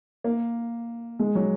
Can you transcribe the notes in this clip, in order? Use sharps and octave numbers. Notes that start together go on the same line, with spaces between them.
A#3
G#3
F#3